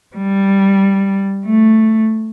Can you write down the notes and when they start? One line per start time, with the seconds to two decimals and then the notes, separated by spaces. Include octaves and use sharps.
0.16 G3
1.45 A3